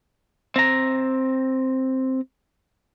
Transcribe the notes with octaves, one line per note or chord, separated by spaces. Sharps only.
C4 A#5